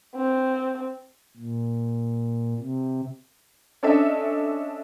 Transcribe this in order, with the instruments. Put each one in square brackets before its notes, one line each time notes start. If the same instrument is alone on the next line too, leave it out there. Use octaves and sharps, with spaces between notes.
[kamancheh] C4
[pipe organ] A#2
C3
[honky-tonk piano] C#4 D4 A4 D#5 E5